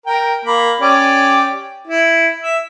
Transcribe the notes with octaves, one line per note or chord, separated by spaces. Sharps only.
A#4 G5
A#3 B5
C#4 G4 D5
E4
E5